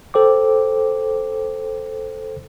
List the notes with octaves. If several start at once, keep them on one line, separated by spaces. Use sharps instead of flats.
A4 C5 G5 D6